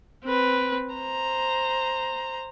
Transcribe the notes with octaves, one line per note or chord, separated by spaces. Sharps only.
C4 B4
C5 A#5